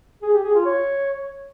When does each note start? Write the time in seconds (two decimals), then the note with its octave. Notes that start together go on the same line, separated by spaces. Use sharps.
0.22 G#4
0.33 G4
0.44 G#4
0.54 F4
0.65 C#5